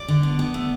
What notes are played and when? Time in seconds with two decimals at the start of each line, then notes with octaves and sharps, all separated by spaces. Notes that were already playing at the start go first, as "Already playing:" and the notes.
Already playing: D5
0.08 D3
0.23 B3
0.39 B3
0.54 A3